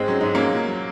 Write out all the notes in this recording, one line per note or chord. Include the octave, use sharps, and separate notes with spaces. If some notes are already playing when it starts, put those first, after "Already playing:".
Already playing: G#2 G#3 C4
F#3 C#4
G#2 D#4
F#3 A#3 C#4
A#2
F#3